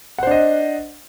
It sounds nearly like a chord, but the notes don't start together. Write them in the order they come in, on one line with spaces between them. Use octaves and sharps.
F#5 C5 D4 D#5